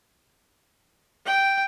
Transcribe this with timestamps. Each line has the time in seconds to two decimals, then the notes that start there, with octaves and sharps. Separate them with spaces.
1.26 G5